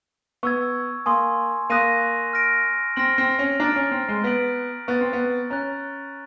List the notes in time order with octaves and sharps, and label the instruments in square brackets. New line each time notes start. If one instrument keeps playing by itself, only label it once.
[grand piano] B3 [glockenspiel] C#6 E6 G#6
[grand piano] A#3 [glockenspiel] G#5 C6 D#6
[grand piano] A#3 [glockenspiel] C6 D#6 F#6 A#6 D#7
[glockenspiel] F6 A#6 D7
[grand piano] C4 [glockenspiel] F6 A#6 D7 F#7
[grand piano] C4
C#4
[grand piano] D4 [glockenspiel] A#5 D6 F6 A6 D7
[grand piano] C#4
C4
G#3
[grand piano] B3 [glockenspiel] F#6 B6 D7 F#7
[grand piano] B3 [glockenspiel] C#6 F#6 A6
[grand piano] C4
B3
[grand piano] C#4 [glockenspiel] A#5 C#6 F#6 A6